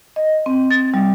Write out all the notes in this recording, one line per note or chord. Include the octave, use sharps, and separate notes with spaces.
D#5
C4
A6
G3